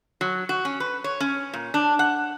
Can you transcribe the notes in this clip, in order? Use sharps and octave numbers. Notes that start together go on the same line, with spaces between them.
F#3
F#4
C#4
B4
C#5
C#4
A#2
D4
F#5